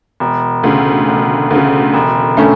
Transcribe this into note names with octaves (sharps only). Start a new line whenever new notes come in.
E1
D2 C#3
E1
D2 C#3
E1
D3 A3 C#4